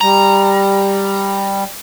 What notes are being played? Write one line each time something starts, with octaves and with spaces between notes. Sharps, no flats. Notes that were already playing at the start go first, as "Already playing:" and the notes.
G3 A#5